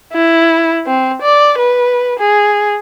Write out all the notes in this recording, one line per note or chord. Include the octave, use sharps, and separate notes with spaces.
E4
C4
D5
B4
G#4